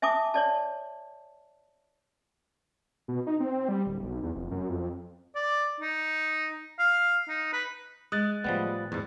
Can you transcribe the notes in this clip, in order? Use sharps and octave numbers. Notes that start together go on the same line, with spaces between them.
E5 G#5 A5 D6 D#6
C#5 D5 A5
B2
D#4
C4
G3
D1
B1
E2
F1
F#2
F2
D5
D#4
F5
D#4
B4
G#3 D#6 F#6 A6
A2 F3 G3 B3
E2 G#2 G3